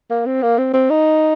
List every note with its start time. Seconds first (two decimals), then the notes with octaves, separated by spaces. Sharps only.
0.10 A#3
0.26 C4
0.43 A#3
0.58 C4
0.74 C4
0.90 D#4